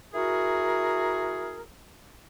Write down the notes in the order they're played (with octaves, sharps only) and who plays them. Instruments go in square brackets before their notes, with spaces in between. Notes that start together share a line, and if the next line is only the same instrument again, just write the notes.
[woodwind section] E4 F#4 G#4 A#4